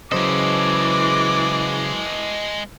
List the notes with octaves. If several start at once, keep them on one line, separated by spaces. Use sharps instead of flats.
C#3 E3 F#3 G#3 A4 C5 D#5 D6